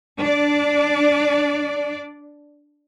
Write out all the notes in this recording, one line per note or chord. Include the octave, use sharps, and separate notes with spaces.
D4 D5